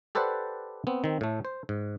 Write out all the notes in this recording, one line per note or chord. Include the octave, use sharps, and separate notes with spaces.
G4 A4 B4 C5 D5 F#5
B3 C4
D#3 C4
A2 A3
C5
G#2